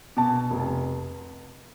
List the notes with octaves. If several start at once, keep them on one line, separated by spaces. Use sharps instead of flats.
B2 A5
F1